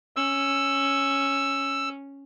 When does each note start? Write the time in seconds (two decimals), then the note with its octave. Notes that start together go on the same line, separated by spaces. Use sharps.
0.16 C#4 E6